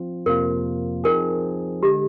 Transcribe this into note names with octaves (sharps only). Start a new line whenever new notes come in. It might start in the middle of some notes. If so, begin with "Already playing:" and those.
Already playing: F3 C4 F4
F2 C3 F3 A#3 F4 A#4
F3 C4 D#4 G#4 A#4
D3 G#3 G4